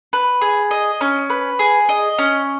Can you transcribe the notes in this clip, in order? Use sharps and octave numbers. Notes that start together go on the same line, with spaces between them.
B4
G#4
D#5
C#4
B4
G#4
D#5
C#4